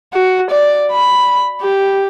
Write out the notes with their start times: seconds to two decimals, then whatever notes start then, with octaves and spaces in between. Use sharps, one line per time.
0.13 F#4
0.50 D5
0.92 B5
1.61 G4